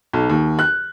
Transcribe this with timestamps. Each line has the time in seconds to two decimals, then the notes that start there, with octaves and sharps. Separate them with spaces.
0.13 B1
0.30 D#2
0.59 F#6